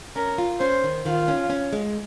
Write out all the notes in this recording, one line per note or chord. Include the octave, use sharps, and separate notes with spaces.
C#4 A#4
F4
C#4 C5
D#3
D#3 F4
C#4
C#4
G#3